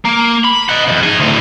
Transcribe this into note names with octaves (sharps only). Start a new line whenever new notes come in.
A#3
B5
D#5 F#5
F2 C3
D#4 G#4
D2 A2